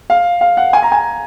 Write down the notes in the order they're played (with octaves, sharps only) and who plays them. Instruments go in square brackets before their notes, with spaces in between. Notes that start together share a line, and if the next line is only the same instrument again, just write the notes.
[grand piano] F5
F5
F#5
G#5
A#5
G#5